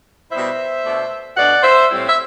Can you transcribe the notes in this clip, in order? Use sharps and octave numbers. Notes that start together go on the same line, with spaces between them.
B2 G3 B3 E4 C5 E5
B2 A3 D4
B2 A3 D4 D5 F#5
C5 E5
A2 G3 C4 E4
E5